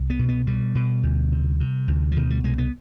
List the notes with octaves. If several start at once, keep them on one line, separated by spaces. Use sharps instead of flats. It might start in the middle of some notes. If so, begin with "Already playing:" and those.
Already playing: C2
B3
B2
B3
B2 G3
B2
D2
C3
C3
D2
F3
B2 D#3
G3
C2 G#3
B3